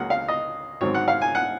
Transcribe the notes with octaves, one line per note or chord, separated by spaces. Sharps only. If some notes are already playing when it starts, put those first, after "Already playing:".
Already playing: C#2 C#3 F#3 A#3 F#5
F5
D#5
G#2 D#3 F#3 C4 C#5
F#5
F5
G#5
F#5